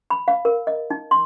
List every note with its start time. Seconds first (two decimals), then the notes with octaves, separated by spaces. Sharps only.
0.10 B5
0.28 F5
0.45 A#4
0.67 D#5
0.90 D#4
1.11 C6